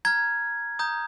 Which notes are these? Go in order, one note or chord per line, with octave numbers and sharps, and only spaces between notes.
A#5 F6 G#6
A#5 D#6 G6